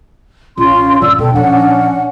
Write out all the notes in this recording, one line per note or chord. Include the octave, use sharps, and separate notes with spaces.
A1 C#4 F4 C6
G#2 D3 D5 E6
B2 A4 G5
A#2 F3 C#4 D4 F#5